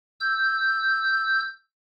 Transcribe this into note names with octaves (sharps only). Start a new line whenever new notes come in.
E6 G6